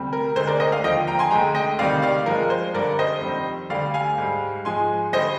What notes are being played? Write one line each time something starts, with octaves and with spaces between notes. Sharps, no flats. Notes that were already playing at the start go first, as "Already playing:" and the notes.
Already playing: D2 C3 G3
A#4
D2 D3 G#3 C5
A#4 D5
C5 D#5
D5 F5
D#2 D3 F3 D#5 G5
G5 A#5
G#5 C6
D2 D3 G#3 G5 A#5
D#5 G5
D2 C3 D#3 G3 D5 F5
D5 F5
G2 F3 G#3 A#4
C5
G2 D3 G3 A#4 D5
C5 D#5
F2 D#3 G3
D2 D3 G3 D5 F5
F5 G#5
G#2 G3
G#2 F3 G#3 G#5 C6
D3 G3 C5 D#5